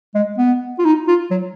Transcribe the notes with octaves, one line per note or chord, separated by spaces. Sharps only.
G#3
B3
F4
D#4
F4
F#3